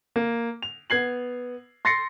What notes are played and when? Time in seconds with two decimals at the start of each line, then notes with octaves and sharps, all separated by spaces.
0.16 A#3
0.62 F7
0.90 B3 G#6 C7 F#7
1.85 C6 A6 A#6 C7 C#7